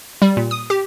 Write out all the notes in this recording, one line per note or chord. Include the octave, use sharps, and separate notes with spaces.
G3
A#2
D#6
G4